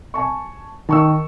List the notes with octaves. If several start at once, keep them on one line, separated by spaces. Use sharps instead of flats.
G#5 A5 C#6
D#3 A5 C#6 E6